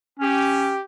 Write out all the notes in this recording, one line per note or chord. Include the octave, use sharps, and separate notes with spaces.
C#4 G4